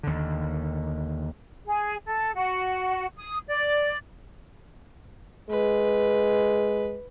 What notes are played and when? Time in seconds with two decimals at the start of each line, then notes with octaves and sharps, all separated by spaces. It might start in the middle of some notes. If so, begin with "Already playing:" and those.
0.03 D#2 D3
1.64 G#4
2.06 A4
2.35 F#4
3.17 D#6
3.48 D5
5.50 G#3 B4